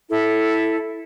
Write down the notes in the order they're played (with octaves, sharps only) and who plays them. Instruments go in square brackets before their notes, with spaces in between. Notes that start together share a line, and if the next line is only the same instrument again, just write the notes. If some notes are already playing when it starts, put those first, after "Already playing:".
[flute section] E4 A4